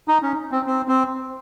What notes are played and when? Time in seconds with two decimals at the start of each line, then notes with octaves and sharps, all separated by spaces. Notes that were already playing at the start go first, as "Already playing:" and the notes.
0.08 D#4
0.22 C#4
0.51 C4
0.66 C4
0.88 C4